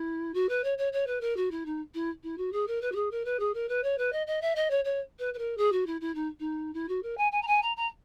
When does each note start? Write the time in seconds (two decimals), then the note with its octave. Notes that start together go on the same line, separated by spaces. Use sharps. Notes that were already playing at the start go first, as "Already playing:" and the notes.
Already playing: E4
0.34 F#4
0.49 B4
0.64 C#5
0.78 C#5
0.93 C#5
1.07 B4
1.21 A#4
1.37 F#4
1.51 E4
1.66 D#4
1.94 E4
2.23 E4
2.38 F#4
2.53 G#4
2.67 A#4
2.82 B4
2.92 F#4
2.96 G#4
3.11 A#4
3.25 B4
3.40 G#4
3.54 A#4
3.69 B4
3.83 C#5
3.98 B4
4.13 D#5
4.27 D#5
4.42 E5
4.56 D#5
4.70 C#5
4.85 C#5
5.19 B4
5.34 B4
5.38 A#4
5.57 G#4
5.72 F#4
5.86 E4
6.01 E4
6.15 D#4
6.40 D#4
6.74 E4
6.89 F#4
7.03 A#4
7.18 G#5
7.32 G#5
7.42 A#5
7.47 G#5
7.62 A#5
7.77 A#5